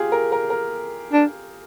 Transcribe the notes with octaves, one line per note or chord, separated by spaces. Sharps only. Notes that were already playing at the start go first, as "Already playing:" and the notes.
Already playing: F4 G4 G#4
A#4
A#4
A#4
D4